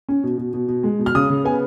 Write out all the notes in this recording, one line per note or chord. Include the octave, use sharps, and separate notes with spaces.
C#4
B2
B2
B2
B2
G#3
B2
F6
C#3 D#6
C#3
B3 G#5